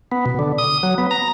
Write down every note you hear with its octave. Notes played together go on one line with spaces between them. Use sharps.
B3
B2
D3
D#6
F#3
B3
A#5